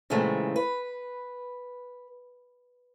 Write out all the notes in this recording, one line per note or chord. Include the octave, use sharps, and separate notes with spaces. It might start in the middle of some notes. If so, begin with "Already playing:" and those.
A#2 C#3 E3 G#3 A3 C4
B4